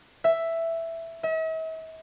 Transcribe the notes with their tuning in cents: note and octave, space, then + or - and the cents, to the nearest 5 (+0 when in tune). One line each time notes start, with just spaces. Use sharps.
E5 +5
E5 -45